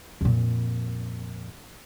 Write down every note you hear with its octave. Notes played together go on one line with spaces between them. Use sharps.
F2 A#2